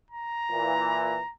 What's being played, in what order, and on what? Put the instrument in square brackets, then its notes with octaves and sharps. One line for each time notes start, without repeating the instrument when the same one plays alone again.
[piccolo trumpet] A#5
[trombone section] A#2 E3